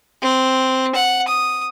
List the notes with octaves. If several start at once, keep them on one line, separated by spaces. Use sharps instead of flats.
C4
F#5
D#6